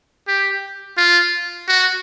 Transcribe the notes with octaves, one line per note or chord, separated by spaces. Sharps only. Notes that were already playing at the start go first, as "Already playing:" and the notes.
G4
F4
F#4